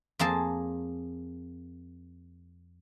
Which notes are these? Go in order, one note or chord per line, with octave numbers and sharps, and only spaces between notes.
F2 A#3 G#4 A5